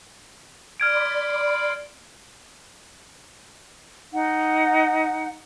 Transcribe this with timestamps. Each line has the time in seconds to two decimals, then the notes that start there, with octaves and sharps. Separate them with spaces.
0.80 D5 B5 C6 F6 G#6 D7
4.13 D#4 F#5